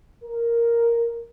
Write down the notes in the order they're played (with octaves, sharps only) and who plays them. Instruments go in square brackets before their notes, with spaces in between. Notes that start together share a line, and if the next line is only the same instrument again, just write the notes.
[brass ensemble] A#4